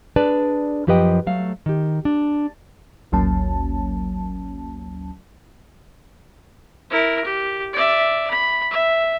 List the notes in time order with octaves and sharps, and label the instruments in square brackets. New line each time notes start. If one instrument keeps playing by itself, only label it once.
[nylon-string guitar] D4 G#4 B4 D5 A5
F#2 F3 G4 B4 D#5 G5
F#3 A3 F5
D#3 G4
D4
[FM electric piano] G#1 D2 F#3 A#3 C#4 A5
[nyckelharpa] E4 A#4
G4
D5 E5
B5
E5